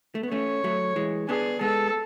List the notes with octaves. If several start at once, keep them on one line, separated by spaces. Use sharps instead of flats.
A3
B3
A3 C#4 C#5
F#3 A3
E3 G#3
B3 D4 G#4
G#3 B3 A4